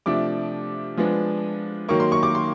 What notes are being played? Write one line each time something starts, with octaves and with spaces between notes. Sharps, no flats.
C3 F3 A3 D4 D6
F3 G#3 B3 D4
D#3 F#3 A#3 C#6
C6
C#6
D6
C6